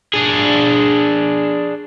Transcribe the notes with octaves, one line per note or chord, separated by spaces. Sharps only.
D4 G#4